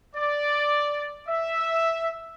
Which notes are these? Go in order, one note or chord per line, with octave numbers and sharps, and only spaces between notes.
D5
E5